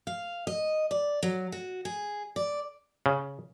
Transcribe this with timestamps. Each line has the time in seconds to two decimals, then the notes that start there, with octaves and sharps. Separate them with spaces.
0.07 F5
0.47 D#5
0.91 D5
1.23 F#3
1.52 F#4
1.85 G#4
2.36 D5
3.06 C#3